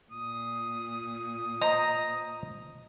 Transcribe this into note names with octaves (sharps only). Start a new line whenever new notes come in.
A#2 D#6
C5 D#5 A#5